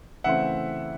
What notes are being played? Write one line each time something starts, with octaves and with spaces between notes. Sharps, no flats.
C#3 E3 A3 C4 E5 F#5